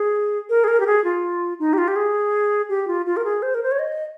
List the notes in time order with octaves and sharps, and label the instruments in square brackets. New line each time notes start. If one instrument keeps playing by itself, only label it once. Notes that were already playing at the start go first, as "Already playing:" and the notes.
Already playing: [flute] G#4
A#4
G#4
A#4
G4
G#4
F4
D#4
G4
F4
G4
G#4
G4
F4
F4
A#4
G#4
C5
A#4
C5
C#5
D#5